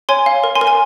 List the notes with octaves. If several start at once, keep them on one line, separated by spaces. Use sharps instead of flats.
C#5 G#5 C6
F5
A#4
G#5 C6
A#4
G#5 C6